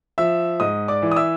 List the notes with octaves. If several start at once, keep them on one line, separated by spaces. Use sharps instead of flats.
F3 E5 E6
G#2 D#5 D#6
D5 D6
E3
D#6
E5 E6